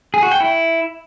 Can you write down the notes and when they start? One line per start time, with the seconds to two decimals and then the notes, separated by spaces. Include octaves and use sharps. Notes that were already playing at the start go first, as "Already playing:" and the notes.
0.14 G#4
0.23 F#4
0.32 G5
0.40 E4